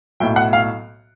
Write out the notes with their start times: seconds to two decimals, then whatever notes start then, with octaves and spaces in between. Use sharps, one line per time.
0.20 B1 A2 F#3 G5
0.36 F#5
0.53 F5